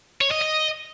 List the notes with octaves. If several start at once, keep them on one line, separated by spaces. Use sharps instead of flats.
C#5
D#5
D#5